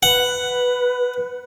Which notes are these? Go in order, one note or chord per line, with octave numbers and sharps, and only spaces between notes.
B4 F#5